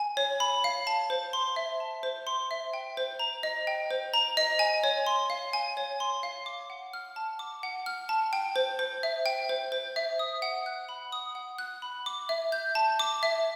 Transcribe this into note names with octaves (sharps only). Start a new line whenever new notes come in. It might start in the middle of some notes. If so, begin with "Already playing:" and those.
Already playing: G#5
C#5
B5
F5
A5
C5
C6
E5
A5
C5
C6
E5
G5
C5
A#5
D#5
G5
C5
A#5
D#5
G#5
C#5
C6
F5
G#5
C#5
C6
F5
D6
F#5
F6
A5
D6
F#5
F6
A5
G5
C5
C5
E5
G5
C5
C5
E5
D#6
F#5
F#6
B5
D#6
F#5
F#6
B5
D6
E5
G6
A5
D6
E5